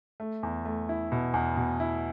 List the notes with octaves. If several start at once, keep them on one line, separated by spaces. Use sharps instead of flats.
A3
E2
A3
E4
B2
E2
B2
E4